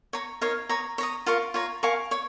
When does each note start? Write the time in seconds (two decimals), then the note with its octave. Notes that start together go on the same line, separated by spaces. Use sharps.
0.13 C#5 A#5 C#6
0.41 D#4 A#4 C#5 F5
0.69 C#5 A#5 D#6
0.98 C#5 A#5 D#6
1.26 F4 A#4 F5 C#6
1.54 F4 C#5 A#5
1.83 A#4 F5 G#5 C#6
2.11 C#5